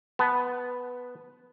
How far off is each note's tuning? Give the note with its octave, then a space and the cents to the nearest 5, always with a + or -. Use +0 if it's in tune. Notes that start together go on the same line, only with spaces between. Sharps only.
B3 +0 A5 -10